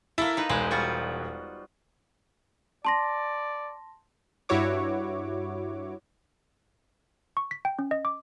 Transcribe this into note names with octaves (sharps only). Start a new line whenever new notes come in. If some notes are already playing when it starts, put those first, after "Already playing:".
A#3 E4 A4 E5
D#4 B4
E1 G#3 B4 C5
G3 F4 F#4
D5 A5 C6 A#6
G2 E4 F#4 C#5 D6
C#6
B6
G5
C#4
D#5
D6